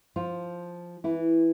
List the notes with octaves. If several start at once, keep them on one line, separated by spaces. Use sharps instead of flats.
F3 F4
E3 E4